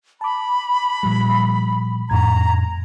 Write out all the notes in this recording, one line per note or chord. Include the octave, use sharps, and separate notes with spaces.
A5 B5 D6
A#2 F3 G3
F2 A2 A#5 G#6